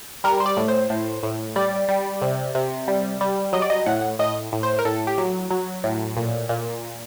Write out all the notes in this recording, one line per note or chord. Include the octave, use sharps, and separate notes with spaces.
G3 A#4
C5
D5
A2
C5
A2
A2
G3 D5
G3
C3
C3
G3
G3
F#3 D#5
D5
D#5
A2 F#5
A2 D#5
A2
C5
A#4
A2 A4
G4
F#3
F#3
A2
A#2
A#2